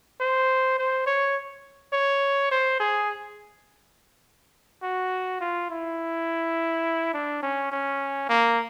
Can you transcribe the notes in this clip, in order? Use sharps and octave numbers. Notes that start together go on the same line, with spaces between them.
C5
C5
C#5
C#5
C5
G#4
F#4
F4
E4
D4
C#4
C#4
A#3